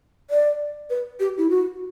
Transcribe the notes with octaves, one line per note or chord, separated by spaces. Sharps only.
D5
B4
G4
E4
F#4